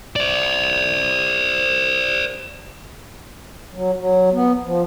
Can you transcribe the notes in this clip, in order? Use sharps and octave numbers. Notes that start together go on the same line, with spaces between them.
C5 D5
F#3
F#3
B3
F3